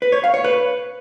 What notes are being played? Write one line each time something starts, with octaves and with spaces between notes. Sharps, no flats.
B4
C#5
F5
C#5
B4